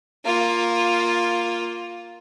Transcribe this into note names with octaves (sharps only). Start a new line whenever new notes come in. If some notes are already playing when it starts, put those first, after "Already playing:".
A#3 F4